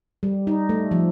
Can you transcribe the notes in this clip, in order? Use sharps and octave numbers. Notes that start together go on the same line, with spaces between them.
G3
D#4
A3
F3